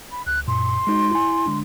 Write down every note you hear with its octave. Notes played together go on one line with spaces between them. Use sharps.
B5
C#2 F#6
F#2 A#2 C6
G#3 D#4 F#4
E4 G#5
D3 G#3 D4